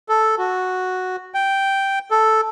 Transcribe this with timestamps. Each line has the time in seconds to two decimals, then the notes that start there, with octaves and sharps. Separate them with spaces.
0.09 A4
0.38 F#4
1.34 G5
2.11 A4